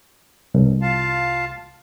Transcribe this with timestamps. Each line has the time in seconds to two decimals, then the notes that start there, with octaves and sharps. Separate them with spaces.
0.54 C2
0.82 F4 F5 A5